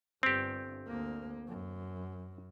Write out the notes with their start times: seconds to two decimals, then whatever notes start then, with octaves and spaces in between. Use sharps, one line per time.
0.23 G1 G2 C4 G4
0.88 D2 A#3
1.48 F#2